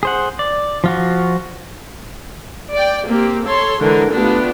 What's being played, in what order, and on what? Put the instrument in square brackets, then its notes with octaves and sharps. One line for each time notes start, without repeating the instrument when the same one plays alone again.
[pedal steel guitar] G#4 C5 F#5
D5
F3 F4 F#4
[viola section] D5 G5
A#3 C4 G4
A4 C#5 C6
D3 E3 G#3 A#4
A3 B3 D4 F4 G4